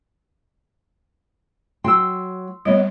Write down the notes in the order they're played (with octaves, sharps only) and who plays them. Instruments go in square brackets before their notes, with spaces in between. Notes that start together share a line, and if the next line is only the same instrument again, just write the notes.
[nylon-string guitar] F#3 F#4 G5 [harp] C6 E6
[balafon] G3 [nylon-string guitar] B3 C#5 D#5